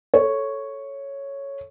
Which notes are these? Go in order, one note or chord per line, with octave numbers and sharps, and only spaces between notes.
A4 C#5